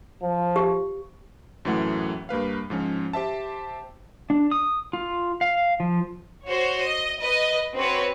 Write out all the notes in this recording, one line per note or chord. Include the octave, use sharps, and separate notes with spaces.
F3
G4
F#2 A2 E3 A3 F#5
G2 A#3 B4 F5
G#2 F3 C#4
G4 C5 E5 A5
D4
D#6
F4
F5
F3
F#4 C5 C#5
D#5
B4 D#5
C4 F#4 B4 C#5